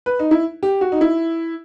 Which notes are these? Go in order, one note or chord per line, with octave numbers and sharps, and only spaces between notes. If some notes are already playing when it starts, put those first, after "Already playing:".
B4
D#4
E4
G4
F#4
D#4
E4